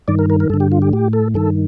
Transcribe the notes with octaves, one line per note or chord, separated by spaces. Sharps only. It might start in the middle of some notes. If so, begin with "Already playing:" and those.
G2 D#3 D5
A#4
A#4
A#4
G2 D3 A4
G4
F4
G4
A2 G4
A4
G2 D#3 A4